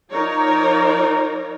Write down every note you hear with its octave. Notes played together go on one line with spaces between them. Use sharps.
F3 D#4 A#4 C#5 D5 A#5